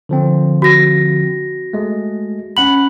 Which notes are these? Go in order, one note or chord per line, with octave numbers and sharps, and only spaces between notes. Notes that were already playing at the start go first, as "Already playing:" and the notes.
D3 F3 C4
F#4 A#6
G#3 A3
C#4 F#5 B5 F#7